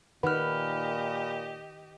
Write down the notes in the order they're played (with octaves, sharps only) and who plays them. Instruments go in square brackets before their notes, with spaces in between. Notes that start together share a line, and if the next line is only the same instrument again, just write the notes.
[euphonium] A#2 [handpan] D#3 B4 F#5 [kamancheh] G4 D#5 [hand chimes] B5 F6